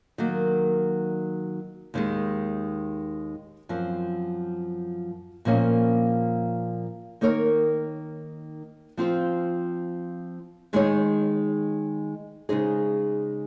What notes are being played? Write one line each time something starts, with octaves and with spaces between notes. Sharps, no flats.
D#3 F#3 A#3
D#2 D#3 G#3
F#2 F3 C4
A#2 F3 A#3 C#4
D#3 A#3 D#4 A#4 C#5
F3 C4 F4 C5
D#3 G#3 D#4 G#4 C#5
C#3 G#3 D#4 G#4 C5